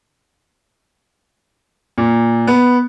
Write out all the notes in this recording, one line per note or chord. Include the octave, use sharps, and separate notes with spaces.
A#2
B3